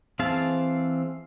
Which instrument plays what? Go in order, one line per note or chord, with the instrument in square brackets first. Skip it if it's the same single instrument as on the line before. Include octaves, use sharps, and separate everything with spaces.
[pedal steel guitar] E3 C4 G#4 F5 A5